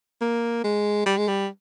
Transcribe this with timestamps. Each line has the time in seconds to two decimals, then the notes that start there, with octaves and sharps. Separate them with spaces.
0.21 A#3
0.64 G#3
1.06 G3
1.18 G#3
1.28 G3